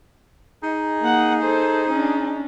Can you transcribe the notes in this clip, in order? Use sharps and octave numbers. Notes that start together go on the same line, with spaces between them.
D#4 G#4
A#3 F#5
A4 C5
C#4 D4